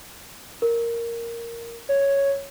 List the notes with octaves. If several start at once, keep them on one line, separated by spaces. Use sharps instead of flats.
A#4
C#5